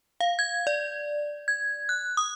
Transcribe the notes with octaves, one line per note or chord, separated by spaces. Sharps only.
F5
G#6
D5
G#6
F#6
D#6